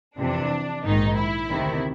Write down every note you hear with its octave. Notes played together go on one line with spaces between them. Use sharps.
F2 C3 E3 D4
A#1 G#2 D#3 D#4
E4
D2 C3 D#3